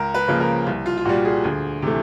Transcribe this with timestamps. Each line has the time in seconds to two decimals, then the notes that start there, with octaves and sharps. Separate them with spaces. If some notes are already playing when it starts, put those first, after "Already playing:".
Already playing: C#2 A#4
0.14 B4
0.28 C#3 F3 A#3
0.40 A#4
0.67 C2
0.86 F4
0.98 F4
1.05 A#2 G3 F#4
1.25 G#4
1.44 D2
1.82 C3 E3 A3